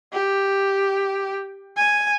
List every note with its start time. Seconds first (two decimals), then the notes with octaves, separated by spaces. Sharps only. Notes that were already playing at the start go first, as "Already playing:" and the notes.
0.13 G4
1.77 G#5